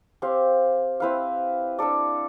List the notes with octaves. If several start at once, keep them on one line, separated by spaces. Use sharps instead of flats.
C4 G4 C5 F5
C4 E4 B4 F5
D4 A4 D5